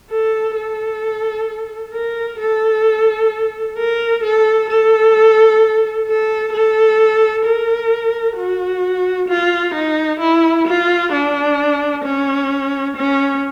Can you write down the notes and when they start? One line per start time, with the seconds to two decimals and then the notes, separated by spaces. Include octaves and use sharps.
0.10 A4
0.56 A4
1.93 A#4
2.40 A4
3.77 A#4
4.24 A4
4.70 A4
6.08 A4
6.53 A4
7.46 A#4
8.37 F#4
9.29 F4
9.74 D#4
10.20 E4
10.67 F4
11.13 D4
12.04 C#4
12.97 C#4